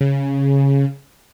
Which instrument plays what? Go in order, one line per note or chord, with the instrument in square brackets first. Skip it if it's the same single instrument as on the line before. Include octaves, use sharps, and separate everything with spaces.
[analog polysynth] C#3